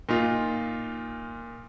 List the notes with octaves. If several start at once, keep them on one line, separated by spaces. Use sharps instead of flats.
A#2 D#4 F4